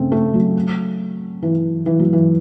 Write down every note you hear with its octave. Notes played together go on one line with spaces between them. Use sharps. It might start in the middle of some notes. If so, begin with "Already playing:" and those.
Already playing: C#3 A3 C4
A3
F#3
E3
E3
F#3
E3